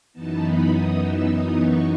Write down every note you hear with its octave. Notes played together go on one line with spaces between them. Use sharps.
F#2 E3 B3 D#4 A5
B5
D#6
E6
D#6
C#6